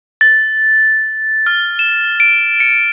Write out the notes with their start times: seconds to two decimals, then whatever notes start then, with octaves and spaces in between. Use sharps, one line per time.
0.21 A6
1.46 F6
1.79 E7
2.20 D7
2.60 C#7